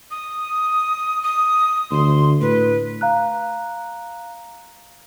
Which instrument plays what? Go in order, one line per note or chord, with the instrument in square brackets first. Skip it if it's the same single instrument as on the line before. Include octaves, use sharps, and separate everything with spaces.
[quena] D#6
D#6
[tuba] D2 [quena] C6
[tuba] A2 [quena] B4
[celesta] F5 A#5 F#6